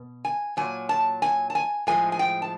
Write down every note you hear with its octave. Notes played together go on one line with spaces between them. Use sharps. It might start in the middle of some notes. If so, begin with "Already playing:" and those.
Already playing: B2
G#5
A#2 F#3 G#5
A5
G#5
A5
G#5
A2 F3 G#3 G#5
G#5
G5
A5